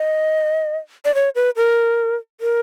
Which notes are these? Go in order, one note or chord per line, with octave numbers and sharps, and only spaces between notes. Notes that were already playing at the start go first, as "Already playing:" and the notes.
Already playing: D#5
D5
C#5
B4
A#4
A#4